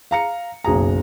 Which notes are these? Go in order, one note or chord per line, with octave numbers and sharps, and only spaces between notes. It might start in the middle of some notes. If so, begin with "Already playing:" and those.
F5 A#5 C#7
F#1 B1 G#4 A#5